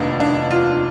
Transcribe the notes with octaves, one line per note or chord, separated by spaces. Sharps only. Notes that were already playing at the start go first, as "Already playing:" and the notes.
Already playing: F1 D#2 B3 D4 D#4
D4
F4